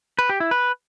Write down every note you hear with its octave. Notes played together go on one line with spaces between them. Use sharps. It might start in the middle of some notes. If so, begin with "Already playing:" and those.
B4
G4
E4
B4